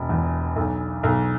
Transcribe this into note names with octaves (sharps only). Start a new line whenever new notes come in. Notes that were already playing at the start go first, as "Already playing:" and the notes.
Already playing: E1
E2
B1
B1